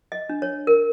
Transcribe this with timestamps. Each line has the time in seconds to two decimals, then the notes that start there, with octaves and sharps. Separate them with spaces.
0.12 D#5
0.29 D4
0.42 C#5
0.67 A#4